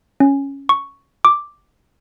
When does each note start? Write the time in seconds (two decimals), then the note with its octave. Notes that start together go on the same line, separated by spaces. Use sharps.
0.20 C#4
0.69 C#6
1.25 D6